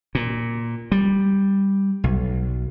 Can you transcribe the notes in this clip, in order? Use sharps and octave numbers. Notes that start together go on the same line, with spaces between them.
A#2
G3
B1